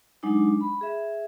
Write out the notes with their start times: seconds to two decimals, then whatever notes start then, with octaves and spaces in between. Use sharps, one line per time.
0.23 F#3 G#3 D4 D#4 D6
0.61 B5
0.81 G#4 E5